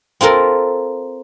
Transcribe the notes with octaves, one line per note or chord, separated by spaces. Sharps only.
C4 F4 A4 A#4